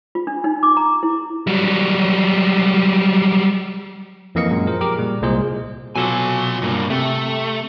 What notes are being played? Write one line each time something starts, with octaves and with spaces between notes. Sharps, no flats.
F4
D4
D#4
D6
A#5
E4
F#3 G3
F2 E3 A#3 D#5 F5 C#7
F#2 A#2 G#3
F3 A#4 C5
G4 G#4 A#4 D6 F6
A#2 G3
C2 A#2 G#3 G#4 C5
B2 F#3 F4 A4 G#5
G2 A#3
C3 A3